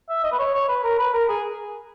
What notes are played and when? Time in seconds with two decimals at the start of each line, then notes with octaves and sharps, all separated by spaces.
0.09 E5
0.24 D#5
0.32 B4
0.39 C#5
0.54 C#5
0.69 B4
0.83 A#4
0.99 B4
1.13 A#4
1.29 G#4